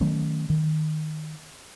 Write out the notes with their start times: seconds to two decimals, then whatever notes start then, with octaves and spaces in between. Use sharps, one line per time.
0.01 D#3 F#3 A3 C#4
0.50 D#3